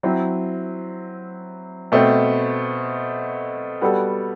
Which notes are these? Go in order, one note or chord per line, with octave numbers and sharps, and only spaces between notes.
F#3 C4 E4
B2 A3 C4
G3 B3 F#4 A4